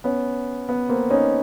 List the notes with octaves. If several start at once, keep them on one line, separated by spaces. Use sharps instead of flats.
B3 C#4
B3
A#3 C4
C#4 D#4